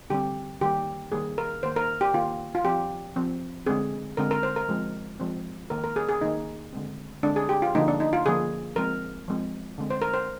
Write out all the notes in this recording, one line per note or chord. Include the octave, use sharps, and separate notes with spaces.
D3 G3 C4 G4
D#3 G3 A#3 G4
D#3 G3 A#3 G#4
A#4
D#3 A#3 C5
A#4
G4
D#3 A#3 F4
F4
F3 C4 G4
F3 C4
D3 G#3 C4 G#4
D3 G#3 C4 A#4
A#4
C5
A#4
F3 G#3 C4
F3 G#3 C4
D#3 A#3 A#4
A#4
G#4
G#4
D#3 A#3 D#4
D3 G#3 C4
D3 G#3 C4 D4
G#4
G4
F4
D3 F3 A#3 D#4
D4
D#4
F4
D3 F3 A#3 G#4
F3 G#3 C4 A#4
F3 G#3 C4
D3 G#3 C4
C5
A#4
C5